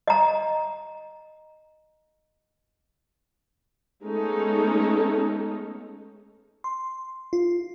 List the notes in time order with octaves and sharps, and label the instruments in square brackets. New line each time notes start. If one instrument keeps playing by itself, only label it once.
[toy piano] D#5 A#5
[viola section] G#3 A3 B3 C#4 D#4 A4
[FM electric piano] C6
F4